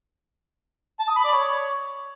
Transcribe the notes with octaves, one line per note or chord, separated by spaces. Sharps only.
A5
D#6
B5
D5
C#5